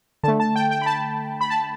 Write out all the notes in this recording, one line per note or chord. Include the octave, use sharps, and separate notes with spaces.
D3 A3 A5
A5
G5
G5
B5
A5
B5
A5